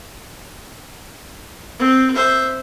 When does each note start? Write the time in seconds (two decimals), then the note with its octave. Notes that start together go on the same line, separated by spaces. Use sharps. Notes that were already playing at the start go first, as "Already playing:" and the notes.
1.79 C4
2.15 C5 E5